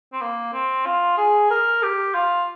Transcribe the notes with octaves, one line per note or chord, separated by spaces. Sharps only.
C4
A#3
C4
F4
G#4
A#4
G4
F4